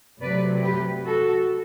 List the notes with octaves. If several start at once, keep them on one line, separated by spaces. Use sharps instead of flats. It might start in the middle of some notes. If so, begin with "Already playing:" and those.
C3 F#3 A3 B4 D5
G4 B4
F#4 A4